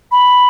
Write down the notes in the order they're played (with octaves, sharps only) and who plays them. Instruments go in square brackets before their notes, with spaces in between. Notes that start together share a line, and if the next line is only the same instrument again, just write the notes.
[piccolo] B5